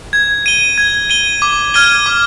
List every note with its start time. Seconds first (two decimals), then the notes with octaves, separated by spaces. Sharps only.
0.13 G#6
0.46 D#7 G7
0.78 G#6
1.10 D#7 G7
1.42 D6
1.74 F6 G#6 D#7 G7
2.06 D6